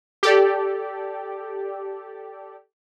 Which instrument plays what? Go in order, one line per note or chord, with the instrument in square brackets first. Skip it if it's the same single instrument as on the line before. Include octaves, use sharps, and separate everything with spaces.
[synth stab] G4 A4 D5